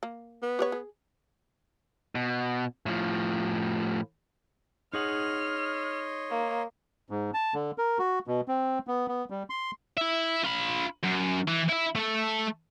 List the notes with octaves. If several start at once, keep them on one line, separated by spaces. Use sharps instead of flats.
A#3
B3
G4 B4 C#5
G#4
B2
A2 F3
D#4 G#4 C#5 D#5 F#5 C6 F6
A#3
G#2
A5
D3
A#4
F#4
B2
C4
B3
B3
G3
C6
E4 E5
F4 B5
F#2
E3
E4 E5
A3 A4